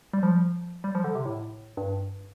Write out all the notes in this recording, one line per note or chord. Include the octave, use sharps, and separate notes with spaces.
G3
F3
G3
F3
D3
C3
A2
G2